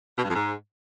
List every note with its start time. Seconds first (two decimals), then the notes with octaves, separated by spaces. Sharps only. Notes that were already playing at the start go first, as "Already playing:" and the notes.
0.18 B2
0.24 G2
0.30 F2
0.35 G#2